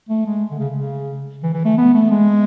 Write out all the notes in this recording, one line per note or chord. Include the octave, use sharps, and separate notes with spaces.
A3
G#3
D3
C#3
C#3
E3
E3
A3
B3
A3
G#3